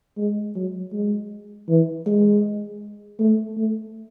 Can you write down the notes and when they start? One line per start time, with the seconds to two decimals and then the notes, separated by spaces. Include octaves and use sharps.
0.17 G#3
0.55 F#3
0.92 G#3
1.69 E3
2.07 G#3
3.20 A3
3.57 A3